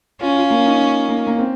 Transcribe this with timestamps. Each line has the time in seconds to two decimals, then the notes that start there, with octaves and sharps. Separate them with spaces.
0.21 C#4 F4
0.36 F4
0.50 A#3
0.66 D#4
1.09 A#3
1.27 A#3
1.39 C4